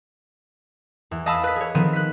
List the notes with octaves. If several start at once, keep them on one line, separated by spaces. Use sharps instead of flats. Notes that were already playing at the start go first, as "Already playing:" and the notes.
E2
D#5 F5 A5 B5 D#6 E6
B4 B6
G#4 C#5
D#3 F3 B3 C4 D#7
F#6 B6